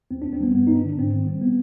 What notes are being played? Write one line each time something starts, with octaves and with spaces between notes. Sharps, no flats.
D#2 C4
D#2 D4
C4
G3 B3
G2 B3
G2 D#4
D4
D3
D4
G#2 C4
D#3 C4
G3 C4
B3